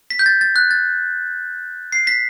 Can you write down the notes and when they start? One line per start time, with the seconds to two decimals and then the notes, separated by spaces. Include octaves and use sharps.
0.10 B6
0.19 G6
0.26 A6
0.41 A6
0.56 F#6
0.71 A6
1.92 C7
2.07 B6